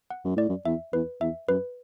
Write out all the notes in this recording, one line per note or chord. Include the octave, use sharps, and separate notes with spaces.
F#5
F#2
A2 D5
F#2
E2 E5
E2 B4
E2 E5
F#2 B4